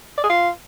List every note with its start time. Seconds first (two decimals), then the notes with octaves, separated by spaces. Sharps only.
0.18 D5
0.23 G#4
0.29 F4